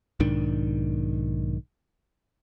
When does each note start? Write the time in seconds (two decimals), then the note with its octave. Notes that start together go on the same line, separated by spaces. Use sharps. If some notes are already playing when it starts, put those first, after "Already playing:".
0.20 B1 G#2 D#3 D4